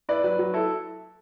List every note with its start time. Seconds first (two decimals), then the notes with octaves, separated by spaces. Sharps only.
0.09 E4 B4 D5
0.24 F#3 B4
0.39 F#3
0.54 E4 A4